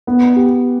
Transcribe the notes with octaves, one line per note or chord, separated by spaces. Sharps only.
B3
G4